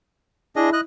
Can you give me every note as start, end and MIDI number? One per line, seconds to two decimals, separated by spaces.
0.56 0.70 62
0.56 0.78 64
0.56 0.70 68
0.56 0.70 75
0.73 0.81 75
0.73 0.81 90